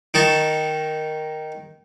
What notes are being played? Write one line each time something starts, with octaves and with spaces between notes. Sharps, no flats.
D#3 D#4 A5 C#6